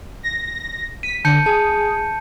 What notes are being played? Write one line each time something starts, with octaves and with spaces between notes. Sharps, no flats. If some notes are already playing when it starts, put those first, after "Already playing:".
A#6
B6 D#7
D3 A5 G6 C#7
G#4 A5